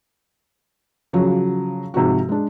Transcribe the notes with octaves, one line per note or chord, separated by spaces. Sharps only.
C#3 F3 F#3
G#2 C3 F3 F#4
G#3 D4